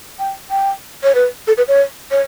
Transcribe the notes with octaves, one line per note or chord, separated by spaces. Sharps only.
G5
G5
C#5
B4
A4
B4
C#5
C#5